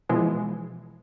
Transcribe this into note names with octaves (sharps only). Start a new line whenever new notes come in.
B2 E3 F3 G#3